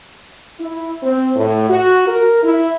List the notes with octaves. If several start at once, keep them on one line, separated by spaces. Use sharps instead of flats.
E4
C4
A2
F#4
A#4
E4